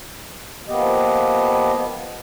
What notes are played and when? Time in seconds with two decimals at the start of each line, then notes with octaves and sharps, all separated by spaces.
0.68 F3 A#3 B3 G4 D#5